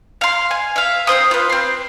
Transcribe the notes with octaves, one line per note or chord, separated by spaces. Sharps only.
F5 C6
G#5
E5 F5
C4 F4 C5 D#6
F4 B4
C4 C6